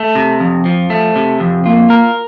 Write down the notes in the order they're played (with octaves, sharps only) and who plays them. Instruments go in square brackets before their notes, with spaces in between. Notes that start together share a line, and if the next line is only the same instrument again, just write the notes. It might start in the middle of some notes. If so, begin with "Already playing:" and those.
Already playing: [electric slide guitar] A3
C3
F2
F3
A3
C3
F2
[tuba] A#3 [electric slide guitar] F4
[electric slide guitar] A#4